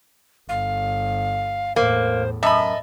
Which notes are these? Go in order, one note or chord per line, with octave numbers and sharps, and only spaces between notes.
G1 F5
E2 A2 A#3 C5
F#2 D#5 E5 A5 B5